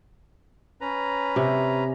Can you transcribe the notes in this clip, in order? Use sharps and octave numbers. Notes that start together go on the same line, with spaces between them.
C#4 B4 A#5
C3